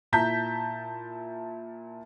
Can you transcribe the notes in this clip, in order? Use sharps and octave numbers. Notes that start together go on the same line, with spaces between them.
A#2 E4 A5 A#5 G6 B6